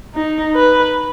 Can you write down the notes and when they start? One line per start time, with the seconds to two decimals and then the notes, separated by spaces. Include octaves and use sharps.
0.15 D#4
0.55 B4